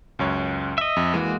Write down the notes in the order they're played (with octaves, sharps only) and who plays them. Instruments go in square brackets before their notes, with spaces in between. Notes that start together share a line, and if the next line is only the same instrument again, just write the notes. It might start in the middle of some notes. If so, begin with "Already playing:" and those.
[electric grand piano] C#2 F#2 C#5
[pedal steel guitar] D#5 E5
[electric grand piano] F2
[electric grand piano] E3 [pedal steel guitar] G#3 A#3 F#4